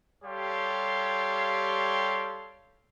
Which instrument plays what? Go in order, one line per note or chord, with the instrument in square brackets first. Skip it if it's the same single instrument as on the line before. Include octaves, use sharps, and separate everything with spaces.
[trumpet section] G3 G4 A4 C#5 F5 C6